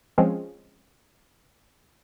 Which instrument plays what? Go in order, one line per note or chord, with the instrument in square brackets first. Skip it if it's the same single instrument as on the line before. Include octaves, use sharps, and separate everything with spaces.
[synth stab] F3 G#3 C4 C#4